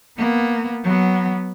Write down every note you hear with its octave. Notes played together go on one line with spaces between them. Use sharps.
A#3 B3
F#3 B3